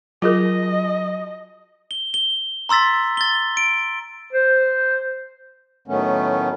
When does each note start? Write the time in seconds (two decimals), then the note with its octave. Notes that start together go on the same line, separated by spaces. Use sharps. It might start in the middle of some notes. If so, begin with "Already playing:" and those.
0.22 F#3 F4 G#4 A#4 D#5
1.91 G7
2.14 G7
2.69 A#5 C6 E6 A6 B6
3.17 A6 G7
3.57 D7
4.33 C5
5.88 A2 D#3 F#3 A3 B3 C#4